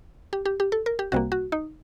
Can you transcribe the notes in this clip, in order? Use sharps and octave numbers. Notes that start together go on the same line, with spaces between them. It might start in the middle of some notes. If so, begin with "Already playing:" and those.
G4
G4
G4
A4
A#4
G4
C2 C3 G3 A#3 F#4
F#4
D#4